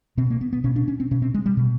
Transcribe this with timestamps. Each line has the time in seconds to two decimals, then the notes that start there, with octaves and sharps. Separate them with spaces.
0.18 B2 C4
0.30 A#3
0.41 B3
0.53 B3
0.64 B2 C#4
0.76 D4
0.88 C#4
1.00 C4
1.11 B2 C#4
1.22 C4
1.34 G#3
1.46 G3
1.57 B2